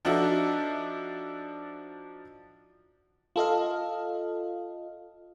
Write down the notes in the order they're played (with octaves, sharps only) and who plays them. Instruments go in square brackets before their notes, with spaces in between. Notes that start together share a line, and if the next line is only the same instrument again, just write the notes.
[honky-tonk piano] F3 D4 D#4 F#4 A4 E5
[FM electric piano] F4 A4 D#5 F5